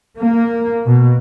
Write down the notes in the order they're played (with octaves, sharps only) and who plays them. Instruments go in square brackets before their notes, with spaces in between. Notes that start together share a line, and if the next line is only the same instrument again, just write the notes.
[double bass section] A#3
B2